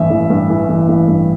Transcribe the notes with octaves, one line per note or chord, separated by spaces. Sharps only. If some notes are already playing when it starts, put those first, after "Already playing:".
Already playing: A1 G2 E3 E5
A1
G2
E3
A1
A1
G2